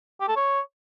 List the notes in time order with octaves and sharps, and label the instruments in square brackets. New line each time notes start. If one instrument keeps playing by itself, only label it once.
[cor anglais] G4
A4
C#5